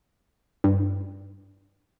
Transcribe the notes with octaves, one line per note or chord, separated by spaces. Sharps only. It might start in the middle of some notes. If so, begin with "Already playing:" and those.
G2